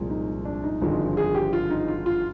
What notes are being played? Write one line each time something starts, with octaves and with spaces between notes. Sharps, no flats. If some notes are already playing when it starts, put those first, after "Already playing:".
Already playing: C2 A#2 F3 G#3
D#4
D4
D#4
G#1 G2 D3 F3 G#3 D#4
G#4
G4
F4
D#4
F4
F4